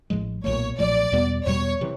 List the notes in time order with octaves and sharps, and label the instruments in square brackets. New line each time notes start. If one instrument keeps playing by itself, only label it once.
[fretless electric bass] A1 A2 F3 G#3
[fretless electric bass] B1 A#2 F3 A3 [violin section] C#5
[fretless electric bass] B1 A#2 F3 A3 [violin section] D5
[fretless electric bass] E2 B2 G3 B3
[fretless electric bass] E2 B2 G3 B3 [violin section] C#5
[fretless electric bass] C3 E3